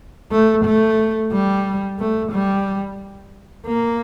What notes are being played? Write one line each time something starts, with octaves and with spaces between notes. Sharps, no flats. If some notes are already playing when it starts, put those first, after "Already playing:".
A3
A3
G3
A3
G3
A#3